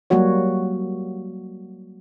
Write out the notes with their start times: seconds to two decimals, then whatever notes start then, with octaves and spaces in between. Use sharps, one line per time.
0.10 F#3 G3 A#3 F#4 C#5